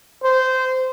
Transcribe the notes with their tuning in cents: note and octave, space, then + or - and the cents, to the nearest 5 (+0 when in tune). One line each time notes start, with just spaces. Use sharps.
C5 -15